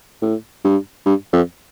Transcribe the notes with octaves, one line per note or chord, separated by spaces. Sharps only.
A2
G2
G2
F2